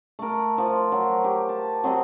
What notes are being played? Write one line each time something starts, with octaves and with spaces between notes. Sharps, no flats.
A3 A#4
F3 F4
F#3
G4
A5
F#3 C4 G4 D#5